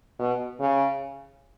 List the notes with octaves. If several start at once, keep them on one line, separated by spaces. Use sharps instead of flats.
B2
C#3